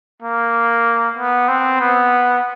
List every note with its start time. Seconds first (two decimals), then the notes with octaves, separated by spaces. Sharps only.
0.22 A#3
1.17 B3
1.48 C4
1.81 B3